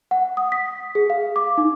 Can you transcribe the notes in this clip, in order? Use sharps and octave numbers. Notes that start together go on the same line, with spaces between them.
F#5
D#6
B6
G#4
F5
D6
D#4